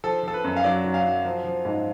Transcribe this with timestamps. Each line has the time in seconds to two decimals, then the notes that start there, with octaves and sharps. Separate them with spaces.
0.04 F3 A4
0.23 F3 A4
0.34 B4
0.44 F#2
0.57 F5
0.64 F#3 D5
0.84 F#3
0.94 F5
1.04 F#3
1.25 F3
1.44 F3
1.65 G#2